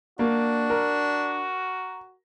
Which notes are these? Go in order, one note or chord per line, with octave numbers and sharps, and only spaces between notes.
A#3 D4 F#4
A#4